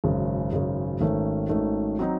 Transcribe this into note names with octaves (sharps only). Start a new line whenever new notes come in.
G#1 F#2 C#3 G#3
G#1 F#2 C#3 G#3
G#1 G#2 D#3 A3 C#4
G#1 G#2 D#3 A3 C#4
F#3 C4 D#4